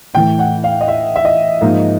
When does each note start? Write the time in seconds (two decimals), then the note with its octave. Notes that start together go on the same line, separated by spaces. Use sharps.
0.14 A2 E3 A3 G5
0.39 F#5
0.64 F5
0.81 D#5
0.88 E5
1.16 E5
1.25 D#5
1.61 G#2 F3 A#3 D#4